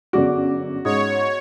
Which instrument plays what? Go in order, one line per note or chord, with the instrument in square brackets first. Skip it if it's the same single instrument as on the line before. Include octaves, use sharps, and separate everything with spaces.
[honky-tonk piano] G1 F#2 D6 [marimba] B3 G#4 D5 [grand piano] F#4
[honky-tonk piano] G#2 C#4 [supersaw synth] C#5 [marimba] D#6